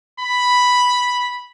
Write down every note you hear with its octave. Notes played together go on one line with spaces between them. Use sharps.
B5